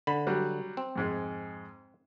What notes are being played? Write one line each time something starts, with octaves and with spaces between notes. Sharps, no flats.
D3 B5
F#3 G3
C4
F2 G#2 G#3